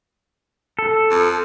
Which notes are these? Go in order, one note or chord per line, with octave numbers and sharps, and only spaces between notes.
A4
F2